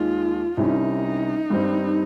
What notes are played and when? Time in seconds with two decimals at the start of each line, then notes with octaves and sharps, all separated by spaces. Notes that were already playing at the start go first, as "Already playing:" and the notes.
Already playing: D#2 D#3 G#3 F4
0.57 C2 C3 D#3 G3 C#4 D#4
1.50 G2 D#3 G3 C4